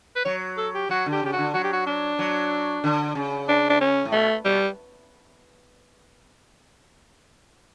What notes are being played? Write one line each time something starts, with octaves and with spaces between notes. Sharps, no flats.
B4
F#3 C#5
A4
G4
F#3 F#4
D3
G4
C#3 G4
F#4
D3
F#3 F#4
G4
F#4
D4
F#3
D3
C#3
D4
D4
C#4
A2
B2 A3
B2 G3